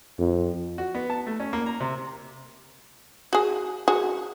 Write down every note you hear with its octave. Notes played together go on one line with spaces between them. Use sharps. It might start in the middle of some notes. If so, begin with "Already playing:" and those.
F2
F#4
B3
A5
A3
C#4
A#3
A#5
C3
F#4 G#4
F#4 G#4